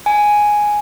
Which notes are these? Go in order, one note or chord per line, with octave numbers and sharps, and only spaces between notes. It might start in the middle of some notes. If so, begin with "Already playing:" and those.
G#5